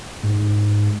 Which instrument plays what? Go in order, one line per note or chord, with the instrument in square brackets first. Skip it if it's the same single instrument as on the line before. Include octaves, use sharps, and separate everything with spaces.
[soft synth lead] G#2